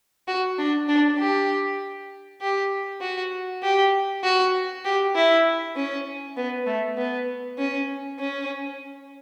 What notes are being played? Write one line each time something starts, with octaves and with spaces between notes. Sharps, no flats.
F#4
D4
D4
G4
G4
F#4
G4
F#4
G4
E4
C#4
B3
A3
B3
C#4
C#4